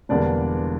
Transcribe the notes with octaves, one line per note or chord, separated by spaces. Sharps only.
E1 E2 D3 G3 A#3 D4 D5